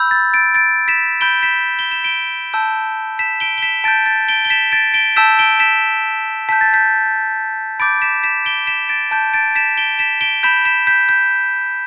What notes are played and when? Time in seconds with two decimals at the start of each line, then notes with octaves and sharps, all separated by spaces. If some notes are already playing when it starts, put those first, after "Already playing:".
Already playing: B5 E6 G6
0.11 A6
0.33 A6 D7
0.55 A6 D7
0.88 B6 E7
1.20 B5 G6 D7 G7
1.43 B6 E7
1.79 G7
1.91 E7
2.04 D7 G7
2.53 A5 E6 G6
3.19 B6 E7
3.40 D7 G7
3.58 G7
3.62 B6 E7
3.84 A5 G6 A6 D7
4.06 A6
4.28 D7 G7
4.45 G7
4.50 B6 E7
4.72 A6 D7
4.94 D7 G7
5.16 A5 E6 G6 B6 E7
5.39 D7 G7
5.60 B6 E7
6.49 A5 G6 B6
6.61 A6
6.74 G6 B6
7.80 B5 D6 G6 A6 D7
8.02 B6 E7
8.23 B6 E7
8.45 D7 G7
8.67 B6 E7
8.89 A6 D7
9.11 A5 G6
9.34 A6 D7
9.55 B6 E7
9.77 D7 G7
9.99 B6 E7
10.21 D7 G7
10.43 B5 G6 B6 E7
10.65 B6 E7
10.87 G6 B6
11.09 G6